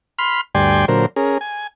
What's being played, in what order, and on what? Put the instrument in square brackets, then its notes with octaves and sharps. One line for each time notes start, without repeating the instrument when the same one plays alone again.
[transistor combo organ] B5 C6 F6
D2 G2 D5 G5 G#5 C6
A#2 D3 F#3 A#4 C5
C#4 G#4 A#4
G#5